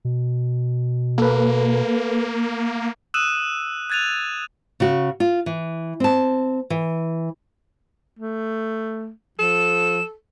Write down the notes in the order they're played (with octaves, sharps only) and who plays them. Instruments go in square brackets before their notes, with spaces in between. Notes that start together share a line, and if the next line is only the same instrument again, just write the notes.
[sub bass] B2
[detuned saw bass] A#3 [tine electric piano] A4 B4
[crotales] D#6 E6 F#6 D#7 E7
F#6 G#6 A6 D#7 F7
[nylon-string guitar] C#3 F#4
F4
E3
C4 A5
E3
[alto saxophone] A3
[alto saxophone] F3 [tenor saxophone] A4 [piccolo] E7